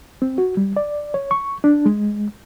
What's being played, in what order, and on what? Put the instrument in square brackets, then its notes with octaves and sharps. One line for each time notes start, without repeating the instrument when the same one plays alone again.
[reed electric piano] C4
F#4
G3
D5
C#5
C#6
D4
G#3